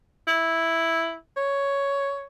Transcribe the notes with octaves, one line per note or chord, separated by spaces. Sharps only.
E4
C#5